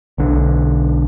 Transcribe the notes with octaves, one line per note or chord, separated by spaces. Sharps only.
B1 D3